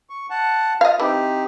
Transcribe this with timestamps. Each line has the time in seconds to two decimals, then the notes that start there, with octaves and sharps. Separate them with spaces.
0.10 C#6
0.30 F#5 A5
0.81 F4 D#5 F5
1.00 E3 C4 D#4 E4 G4